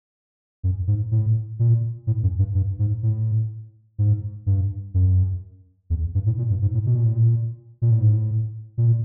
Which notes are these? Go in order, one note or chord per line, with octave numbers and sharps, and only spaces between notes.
F#2
G#2
A2
A#2
A2
F#2
G2
G2
G#2
A2
G#2
G2
F#2
E2
G2
A2
A#2
G2
G#2
A2
B2
A#2
A2
A#2
A#2
A2
G#2
A2
A#2